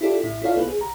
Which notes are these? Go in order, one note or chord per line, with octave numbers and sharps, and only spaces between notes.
E4 F4 G4 A4 D5
A1 A2 E4
E4 F4 A4 C#5 D5 F5
C2 B3 B4
G#4
C2 A#5